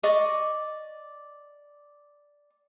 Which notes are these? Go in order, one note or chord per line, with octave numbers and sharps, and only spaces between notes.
D5 D#5 C#6